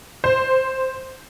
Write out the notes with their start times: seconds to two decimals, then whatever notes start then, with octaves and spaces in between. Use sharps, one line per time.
0.24 C5